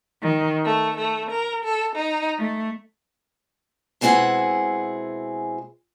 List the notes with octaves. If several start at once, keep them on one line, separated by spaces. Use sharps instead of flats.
D#3
A3
A3
A#4
A4
D#4
A3
B2 G#3 C4 E4 G#4 F#5